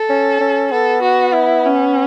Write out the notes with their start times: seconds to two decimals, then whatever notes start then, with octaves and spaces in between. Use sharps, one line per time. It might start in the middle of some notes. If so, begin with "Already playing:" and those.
Already playing: A4
0.10 C#4
0.41 C#4
0.72 B3 A4
1.02 F#4
1.34 E4
1.65 C#4